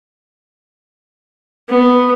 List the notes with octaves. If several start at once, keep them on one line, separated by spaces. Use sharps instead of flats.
B3